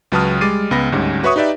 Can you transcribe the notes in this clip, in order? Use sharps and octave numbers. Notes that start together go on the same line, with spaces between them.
C#2 F#3 B4 A5 D#6 F6
G3 G#3 D6 A6 C7 D#7
C#2 B3 B5 A#6
D2 G#2 G3 C#4
F#4 B4 C#5 E5 C#6 D#6
D#4 G4 B4 D5 E5